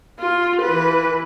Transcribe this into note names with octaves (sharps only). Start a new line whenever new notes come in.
F4
E3 B4